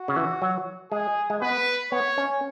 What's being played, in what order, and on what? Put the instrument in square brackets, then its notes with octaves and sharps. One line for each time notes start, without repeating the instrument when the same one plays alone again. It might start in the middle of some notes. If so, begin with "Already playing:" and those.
Already playing: [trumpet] F#4
[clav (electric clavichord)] C#3
E3
F#3
[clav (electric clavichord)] G#3 [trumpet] G#4
[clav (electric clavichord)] G#3
[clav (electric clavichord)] B3 [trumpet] B4
[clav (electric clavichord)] B3 [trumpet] C#5
[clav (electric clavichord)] C#4